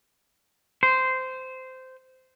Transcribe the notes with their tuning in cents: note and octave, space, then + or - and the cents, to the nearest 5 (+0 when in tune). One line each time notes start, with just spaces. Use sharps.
C5 -15